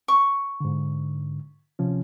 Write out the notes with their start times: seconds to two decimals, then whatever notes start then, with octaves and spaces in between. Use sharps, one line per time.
0.08 C#6
0.60 G#2 D3
1.79 C3 F3 C#4